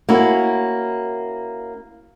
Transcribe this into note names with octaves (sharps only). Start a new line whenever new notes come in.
A#3 C#4 E4 F#4